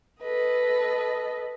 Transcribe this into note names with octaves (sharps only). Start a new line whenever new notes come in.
A4 B4 D#5